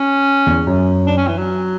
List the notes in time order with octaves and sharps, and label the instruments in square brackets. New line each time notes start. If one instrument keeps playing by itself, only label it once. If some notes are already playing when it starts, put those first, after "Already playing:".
Already playing: [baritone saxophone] C#4
[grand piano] E2
F#2
[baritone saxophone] D4
C#4
E3
F#3